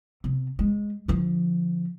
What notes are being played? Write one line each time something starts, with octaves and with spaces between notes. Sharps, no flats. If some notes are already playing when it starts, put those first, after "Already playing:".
C3
G#3
D3 F3